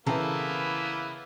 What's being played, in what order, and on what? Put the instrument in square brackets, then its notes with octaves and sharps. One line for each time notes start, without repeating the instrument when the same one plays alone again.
[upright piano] C#3 E3 [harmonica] A#3 B3 E4 [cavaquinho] A4 A#4 C5